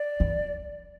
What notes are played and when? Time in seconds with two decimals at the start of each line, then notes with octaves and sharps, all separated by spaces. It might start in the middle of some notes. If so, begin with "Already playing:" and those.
Already playing: D5
0.20 E2